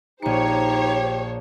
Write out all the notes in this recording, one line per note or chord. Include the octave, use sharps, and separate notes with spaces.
A#1 D#4 G4 C5 C#5 C#7